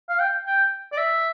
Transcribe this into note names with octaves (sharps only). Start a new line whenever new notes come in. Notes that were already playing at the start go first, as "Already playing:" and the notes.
F5
G5
G5
D5
E5